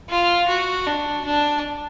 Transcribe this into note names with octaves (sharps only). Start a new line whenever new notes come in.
F4
F#4
D4
D4